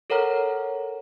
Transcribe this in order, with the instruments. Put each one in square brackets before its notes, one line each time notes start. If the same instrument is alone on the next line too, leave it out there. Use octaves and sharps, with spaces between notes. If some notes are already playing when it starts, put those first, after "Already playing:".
[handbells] A4 A#4 C#5 F#5 A#5 F6